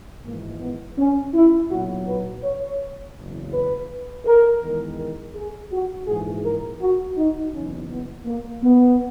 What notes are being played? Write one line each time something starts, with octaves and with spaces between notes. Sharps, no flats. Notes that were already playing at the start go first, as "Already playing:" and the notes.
G#1 G#2 E3 G#3 A#3
B3
C#4
E4
B1 A#2 F#3 F#4
B4
C#5
F#1 E2 C#3
B4
A#4
E2 D#3 G#3
A#4
G#4
F#4
A#1 G#2 E3 G#4
A#4
F#4
D#4
F#1 E2 B2 C#4
B3
A#3
B3